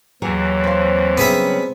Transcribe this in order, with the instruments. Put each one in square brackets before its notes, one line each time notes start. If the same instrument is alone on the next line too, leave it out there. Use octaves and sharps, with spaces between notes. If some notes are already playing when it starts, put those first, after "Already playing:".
[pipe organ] D#2 E3 [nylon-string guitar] F#3 G#4 C#5
[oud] C4 F5
[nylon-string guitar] C#3 F#3 G3 [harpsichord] B3 G#4 E5